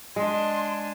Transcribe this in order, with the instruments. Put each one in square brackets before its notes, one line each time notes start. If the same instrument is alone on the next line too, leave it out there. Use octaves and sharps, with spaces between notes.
[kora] G#3 [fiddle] D4 G#5 [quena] C6